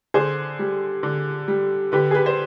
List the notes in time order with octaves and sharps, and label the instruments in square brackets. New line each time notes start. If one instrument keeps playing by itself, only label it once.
[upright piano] D3 G#4 C5
G3
D3
G3
D3 G4 B4
G#4
G4 B4
C5